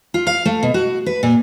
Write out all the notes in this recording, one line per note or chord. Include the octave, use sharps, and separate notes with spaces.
F4
F5
A3
B2
F#4
B4
A#2